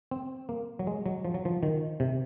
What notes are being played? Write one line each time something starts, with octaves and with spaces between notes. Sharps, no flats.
C4
A#3
F#3
G#3
F#3
F3
F#3
F3
D#3
C3